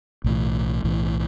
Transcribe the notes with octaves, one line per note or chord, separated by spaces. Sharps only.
B1 A2 E3
B1 A2 E3